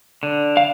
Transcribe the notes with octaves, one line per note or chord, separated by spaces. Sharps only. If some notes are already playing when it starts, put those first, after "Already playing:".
D3
F5